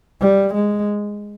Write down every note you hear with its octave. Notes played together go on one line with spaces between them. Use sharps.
G3
G#3